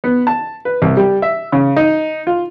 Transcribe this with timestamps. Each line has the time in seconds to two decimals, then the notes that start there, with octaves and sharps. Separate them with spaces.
0.04 B3
0.27 A5
0.65 B4
0.82 C2
0.97 G3
1.22 E5
1.52 C#3
1.76 D#4
2.27 F4